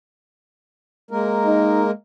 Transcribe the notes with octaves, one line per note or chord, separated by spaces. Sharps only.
G#3 A#3 A#4
D#4